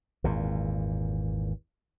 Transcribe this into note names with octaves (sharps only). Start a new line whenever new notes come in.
G#1 E2 A#2